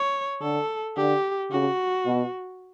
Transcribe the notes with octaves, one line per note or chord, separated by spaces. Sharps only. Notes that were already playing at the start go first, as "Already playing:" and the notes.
Already playing: C#5
D3 A4
D3 G4
C#3 F#4
B2